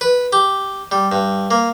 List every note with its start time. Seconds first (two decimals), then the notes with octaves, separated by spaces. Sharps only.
0.01 B4
0.33 G4
0.92 G3
1.12 G2
1.51 A#3